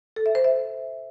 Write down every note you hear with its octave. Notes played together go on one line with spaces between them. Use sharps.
A4
E5
C5
E5